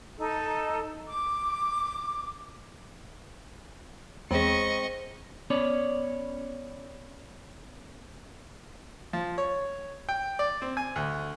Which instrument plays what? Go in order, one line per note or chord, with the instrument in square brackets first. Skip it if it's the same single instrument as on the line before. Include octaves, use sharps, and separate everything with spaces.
[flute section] D#4 A4
D6
[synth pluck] E2 [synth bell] G#3 G#4 [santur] C4 [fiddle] D#5 C#6
[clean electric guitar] B3 C#4 C#5 D5
[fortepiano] F3
C#5
G5
D5
C4
G#5
D2